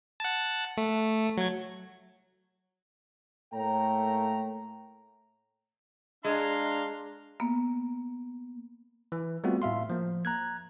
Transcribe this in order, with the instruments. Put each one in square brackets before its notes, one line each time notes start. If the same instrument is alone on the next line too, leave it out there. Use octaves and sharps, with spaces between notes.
[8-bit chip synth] F#5 A5
A3
F#3 G#6
[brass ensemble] A2 A3 A#3 C#5 G5 A#5
[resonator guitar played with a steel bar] G#3 [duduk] D4 [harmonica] F5 A#5 C6
[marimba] A#3 B3
[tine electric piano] E3
G3 A3 B3 C4 F4 F#4
A2 E5 F5 C6
F3 A#3
A#5 F#6 G#6